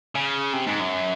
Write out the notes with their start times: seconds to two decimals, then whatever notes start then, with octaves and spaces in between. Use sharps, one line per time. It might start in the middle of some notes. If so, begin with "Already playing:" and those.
0.15 C#3
0.53 C3
0.67 G#2
0.80 F#2